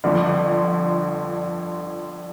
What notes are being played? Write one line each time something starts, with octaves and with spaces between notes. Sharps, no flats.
G1 F2 D3